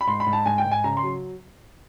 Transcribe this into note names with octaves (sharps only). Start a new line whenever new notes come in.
B5
G#2 C6
B5
G#2
A5
G#2 G#5
G5
G#2
G#5
C#3 A#5
C6
F#3